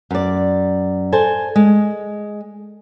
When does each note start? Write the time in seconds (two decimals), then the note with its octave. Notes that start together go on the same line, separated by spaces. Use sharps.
0.11 F#2 D5
1.12 A4 C5 G#5
1.56 G#3